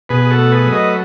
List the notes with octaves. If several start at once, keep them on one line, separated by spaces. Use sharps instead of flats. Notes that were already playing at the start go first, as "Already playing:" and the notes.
B2 G#4 B4
G#4
F#4 A4
A3
G#4 B4
F#3
B4 D#5